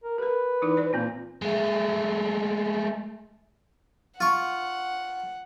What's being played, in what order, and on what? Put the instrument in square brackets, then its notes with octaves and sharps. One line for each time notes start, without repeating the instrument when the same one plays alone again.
[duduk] A#4
[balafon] G4 A#4 [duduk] B4
[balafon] E3 D#4 E4
C5 D5
[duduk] A#2 [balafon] A#3 C4 F4
[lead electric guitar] G#3 A3
[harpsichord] F4 C#6 [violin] F#5